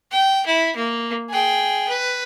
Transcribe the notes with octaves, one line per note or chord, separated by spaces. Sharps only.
G5
E4
A#3
G#4 G5
B4